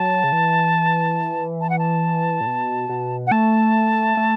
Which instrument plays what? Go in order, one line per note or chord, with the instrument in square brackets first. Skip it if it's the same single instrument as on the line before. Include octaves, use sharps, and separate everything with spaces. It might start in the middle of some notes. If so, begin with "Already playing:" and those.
Already playing: [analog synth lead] F#3 [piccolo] A5
[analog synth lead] C#3
E3
[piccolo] A5
F#5
A5
[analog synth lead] A2
B2
B2
[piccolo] F#5
[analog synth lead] A3 [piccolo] A5
[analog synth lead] A3